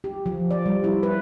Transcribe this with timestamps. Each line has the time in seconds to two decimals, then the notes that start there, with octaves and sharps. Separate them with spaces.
0.04 G4
0.26 F3
0.51 D5
0.66 G3
0.84 E4
1.03 B4